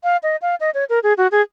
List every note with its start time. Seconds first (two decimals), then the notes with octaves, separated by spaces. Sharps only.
0.04 F5
0.23 D#5
0.42 F5
0.60 D#5
0.74 C#5
0.89 A#4
1.03 G#4
1.18 F#4
1.32 G#4